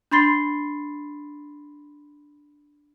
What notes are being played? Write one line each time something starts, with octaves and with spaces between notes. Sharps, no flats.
D4 B5 C6 A6 C7 G7